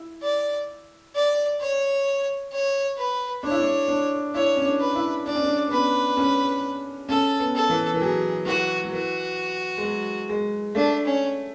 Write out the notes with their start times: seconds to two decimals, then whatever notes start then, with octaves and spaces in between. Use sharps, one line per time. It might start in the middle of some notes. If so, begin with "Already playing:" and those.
Already playing: E4
0.22 D5
1.15 D5
1.60 C#5
2.52 C#5
2.97 B4
3.43 D4 C#5
3.51 E4
3.60 D4
3.88 D4
4.34 E4 C#5
4.57 C#4
4.65 D4
4.79 B4
4.95 E4
5.25 D4 D5
5.35 C#4
5.44 D4
5.67 B3
5.71 C#4 B4
6.17 C#4
7.09 C#4 A4
7.39 B3
7.55 A4
7.70 E3
7.94 E3
8.00 F#3 G#4
8.45 E3 F#4
8.83 F#3
8.92 E3 F#4
9.78 G#3
9.83 F#3
10.29 G#3
10.75 A3 D4
11.05 C#4